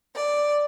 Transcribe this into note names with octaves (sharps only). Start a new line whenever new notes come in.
D5